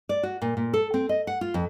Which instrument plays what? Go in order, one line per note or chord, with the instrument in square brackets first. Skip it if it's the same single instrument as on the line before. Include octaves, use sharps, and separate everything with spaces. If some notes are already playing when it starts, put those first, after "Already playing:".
[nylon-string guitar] D5
F#4
A#2
A#2
A4
C4
D#5
F#5
F4
F2